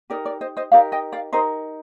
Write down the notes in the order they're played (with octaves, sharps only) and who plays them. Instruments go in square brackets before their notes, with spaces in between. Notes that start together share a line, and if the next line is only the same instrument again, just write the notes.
[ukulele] D#4 G4 A#4 D5
D5
C5 D#5
C5 D#5
D#4 G4 A#4 D5 F5
D#5 G5
D5 F5
D#4 G4 A#4 C5 D#5